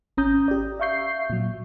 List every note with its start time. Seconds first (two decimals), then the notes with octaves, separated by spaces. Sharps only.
0.17 G#1 C#4 A#5 D#6 G6
0.48 G4 D5
0.80 E5 F5 C#6 G6 C7
1.30 A#2 F#3